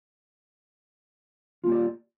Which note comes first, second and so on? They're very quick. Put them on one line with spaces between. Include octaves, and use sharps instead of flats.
F4 A#3 G4 D5